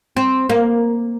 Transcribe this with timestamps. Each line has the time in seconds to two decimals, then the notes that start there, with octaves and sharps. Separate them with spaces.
0.17 C4
0.50 A#3